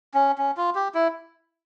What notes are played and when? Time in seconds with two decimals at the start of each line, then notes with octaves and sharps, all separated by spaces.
0.14 C#4
0.38 C#4
0.57 F4
0.75 G4
0.95 E4